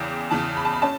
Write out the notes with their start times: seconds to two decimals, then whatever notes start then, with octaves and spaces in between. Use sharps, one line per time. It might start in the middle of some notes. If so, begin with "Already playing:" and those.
Already playing: E2 C#3 E3 G5
0.31 E2 C#3 E3 A5
0.57 B5
0.65 A5
0.74 B5
0.82 C#4 A5